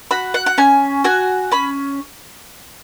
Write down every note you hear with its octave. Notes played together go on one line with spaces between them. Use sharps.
F#4 B5
F#5
F#5
C#4 G#5
F#4 G#5
C#4 B5